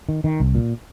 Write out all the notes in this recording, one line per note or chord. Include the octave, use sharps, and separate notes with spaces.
D#3
D#3
C2
A#2